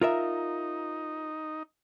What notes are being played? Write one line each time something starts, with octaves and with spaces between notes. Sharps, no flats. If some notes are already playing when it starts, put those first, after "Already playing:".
D#4 F4 A#4 E5